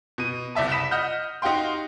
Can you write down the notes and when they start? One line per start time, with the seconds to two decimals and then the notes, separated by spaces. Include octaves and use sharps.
0.18 B2 D#7
0.55 F#1 C2 D5 E5 A5
0.72 B5 D#6 B6 E7
0.91 D#5 F#5 F6 G6
1.42 D#4 F#4 G4 F5 G5 C6